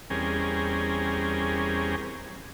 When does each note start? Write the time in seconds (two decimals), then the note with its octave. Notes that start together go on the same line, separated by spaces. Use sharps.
0.10 E2 G3 C4 C#4 G#4 A#4